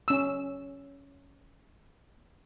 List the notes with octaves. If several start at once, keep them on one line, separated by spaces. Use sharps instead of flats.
C#4 E6